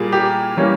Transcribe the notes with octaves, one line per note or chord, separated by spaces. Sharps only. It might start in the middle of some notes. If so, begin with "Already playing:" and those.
Already playing: A#2 G3 A#3 G#4
G4
E3 G3 A#3 C#4